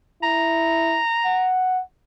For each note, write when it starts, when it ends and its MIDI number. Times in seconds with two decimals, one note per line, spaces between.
0.23 1.00 64
0.23 1.51 82
1.25 1.82 78